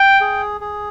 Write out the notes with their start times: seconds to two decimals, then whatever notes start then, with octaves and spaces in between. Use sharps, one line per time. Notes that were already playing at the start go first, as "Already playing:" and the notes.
Already playing: G5
0.21 G#4
0.61 G#4